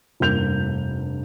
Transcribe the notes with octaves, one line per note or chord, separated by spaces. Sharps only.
F1 G2 A#3 G6 F7